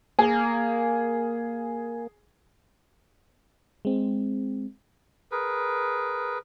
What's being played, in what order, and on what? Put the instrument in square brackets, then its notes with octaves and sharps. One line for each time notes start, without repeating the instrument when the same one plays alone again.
[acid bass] A#3 [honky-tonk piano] G#4
[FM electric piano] G#3 C4
[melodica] G#4 A#4 B4